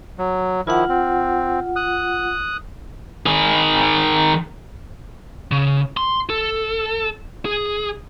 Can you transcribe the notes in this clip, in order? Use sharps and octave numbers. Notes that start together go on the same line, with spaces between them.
F#3
D#3 F3 E4 F4 F#5
C4
D#6 F#6
D#3 G#4
C#3
C6
A4
G#4